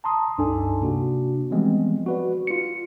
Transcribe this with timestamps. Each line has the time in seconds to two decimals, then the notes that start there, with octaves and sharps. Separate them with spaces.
0.04 A5 A#5 C6 D#6
0.38 C#2 G2 D4 D#4 A4 G#5
0.81 C3 A#3 D4 F#4
1.51 E3 F3 G3 G#3 B3 C4
2.06 F#4 B4 D5
2.47 F4 C#7